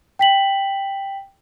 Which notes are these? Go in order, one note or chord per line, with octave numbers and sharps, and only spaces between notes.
G5 B6 F#7